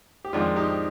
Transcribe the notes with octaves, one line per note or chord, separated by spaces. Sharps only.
G4
F2 D#3 G#3 D4 F4
D#4 G4